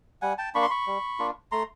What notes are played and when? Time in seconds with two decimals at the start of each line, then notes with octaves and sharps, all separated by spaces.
0.22 G3 F#5 G#5
0.38 G5 A5
0.55 A#3 D4 B5 C#6
0.62 C6
0.70 B5 C#6
0.87 G3
1.19 A#3 D4 F4
1.52 A3 A#5 C6